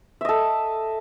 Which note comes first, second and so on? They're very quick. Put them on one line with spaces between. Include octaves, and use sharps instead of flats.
E5 D#5 A4